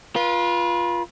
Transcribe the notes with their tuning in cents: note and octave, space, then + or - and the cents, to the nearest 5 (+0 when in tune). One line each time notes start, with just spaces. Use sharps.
F4 +0 B4 -35